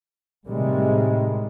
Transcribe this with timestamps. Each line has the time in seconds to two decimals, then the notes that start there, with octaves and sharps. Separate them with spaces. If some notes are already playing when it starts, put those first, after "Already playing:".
0.48 A2 C3 D#3 G3 G#3